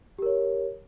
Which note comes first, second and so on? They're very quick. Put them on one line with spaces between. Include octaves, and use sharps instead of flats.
G4 A#4 C#5